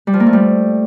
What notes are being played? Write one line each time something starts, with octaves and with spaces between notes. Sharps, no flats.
G3
F3
A#3
A3
G3